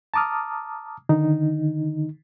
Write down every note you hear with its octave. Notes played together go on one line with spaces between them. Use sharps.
A5 A#5 D6 D#6 F6
D3 D#3 D#4